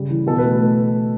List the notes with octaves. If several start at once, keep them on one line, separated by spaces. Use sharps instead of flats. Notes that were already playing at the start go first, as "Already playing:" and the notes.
Already playing: C#3 G3
E3
B2 A4
B4
A3